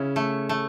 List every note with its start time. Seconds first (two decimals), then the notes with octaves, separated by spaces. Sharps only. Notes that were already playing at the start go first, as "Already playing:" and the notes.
Already playing: C#3 C#4 E4
0.16 A3
0.49 A3